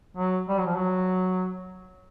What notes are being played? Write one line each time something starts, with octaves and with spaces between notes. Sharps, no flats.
F#3
G3
F#3
F3
F#3